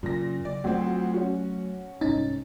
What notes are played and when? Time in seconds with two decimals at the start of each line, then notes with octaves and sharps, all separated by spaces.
0.03 F#2 A#2 C#3 A#3 A#6
0.45 F#1 D5
0.64 D2 F3 F#3 A3 C4
1.14 C#4 F#4
2.01 C2 G#2 C#4 D#4 A6